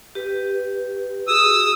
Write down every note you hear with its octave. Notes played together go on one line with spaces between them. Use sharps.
G4 B4
F#4 G#4 D#6 E6